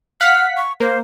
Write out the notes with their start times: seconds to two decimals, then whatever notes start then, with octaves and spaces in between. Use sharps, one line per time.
0.21 F5 F#5 F6 B6
0.57 C#6
0.80 A#3 C5